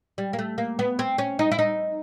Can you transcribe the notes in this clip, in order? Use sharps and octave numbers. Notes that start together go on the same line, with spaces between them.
G3
A#3
A3
A#3
B3
C4
C#4
D#4
E4
D#4